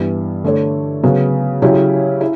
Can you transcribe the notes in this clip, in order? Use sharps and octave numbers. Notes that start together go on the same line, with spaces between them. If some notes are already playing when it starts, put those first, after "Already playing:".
Already playing: G2 E3 G3 B3
D3 A3 D4 A4 C#5
C#3 F#3 B3 F#4
C#3 F#3 C#4 E4 G4
E4